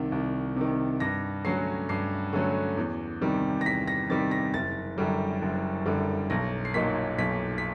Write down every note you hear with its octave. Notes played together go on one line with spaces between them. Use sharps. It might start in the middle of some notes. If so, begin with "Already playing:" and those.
Already playing: C2 C3 D#3
C2
C3 D#3
G2 A#6
D3 F#3 A3 C#4 C7
G2 C7
D3 F#3 A3 C#4
E2
C3 D#3 G3
A#6
E2 B6
A#6
C3 D#3 G3 A6
A#6
F#1 A6
F#2 D3 G3
F#1
F#2 D3 G3
B1 A#6
C7
A#2 F#3 A#3 D#4 B6
B1 B6
B6